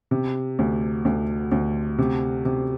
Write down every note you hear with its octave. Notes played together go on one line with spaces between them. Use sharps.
C3
D2
D2
D2
C3
C3